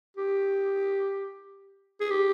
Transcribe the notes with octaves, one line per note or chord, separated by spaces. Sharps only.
G4
G#4
G4